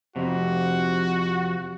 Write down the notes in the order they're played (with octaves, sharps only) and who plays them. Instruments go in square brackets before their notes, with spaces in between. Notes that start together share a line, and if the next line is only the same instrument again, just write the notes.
[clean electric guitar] F2 C3 [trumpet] F#4